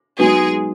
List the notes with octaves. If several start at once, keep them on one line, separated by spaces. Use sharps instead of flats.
F#3 G#3 B3 D#4 F#4 G#4